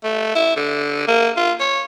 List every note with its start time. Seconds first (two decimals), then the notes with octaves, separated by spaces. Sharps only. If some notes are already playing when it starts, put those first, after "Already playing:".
0.04 A3
0.35 E4
0.56 D3
1.08 A#3
1.37 F4
1.60 C#5